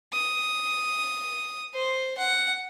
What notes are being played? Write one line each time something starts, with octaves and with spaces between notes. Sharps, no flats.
D#6
C5
F#5